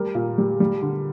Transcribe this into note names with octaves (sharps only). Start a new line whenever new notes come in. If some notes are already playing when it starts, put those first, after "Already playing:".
Already playing: G3 A#4
A#2
G3
G3
D3